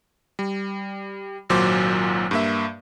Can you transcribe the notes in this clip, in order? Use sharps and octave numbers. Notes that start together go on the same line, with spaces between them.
G3
G#1 A#2 F#3 C5 D6
G2 A#3 E5